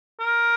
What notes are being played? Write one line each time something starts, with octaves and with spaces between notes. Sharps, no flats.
A#4